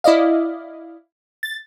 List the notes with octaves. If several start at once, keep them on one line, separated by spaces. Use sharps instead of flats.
E4 D5 D#5 F5
A6